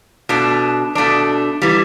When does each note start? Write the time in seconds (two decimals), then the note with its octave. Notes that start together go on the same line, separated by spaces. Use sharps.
0.29 B2 A3 D4
0.95 B2 A3 D4
1.62 E3 G3